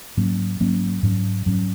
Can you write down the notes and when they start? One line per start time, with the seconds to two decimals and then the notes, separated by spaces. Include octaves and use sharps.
0.17 G#2 F#3 A#3 C#4
0.60 G#2 F#3 A#3 C#4
1.03 G#2 F#3 C#4
1.46 G#2 F#3 C#4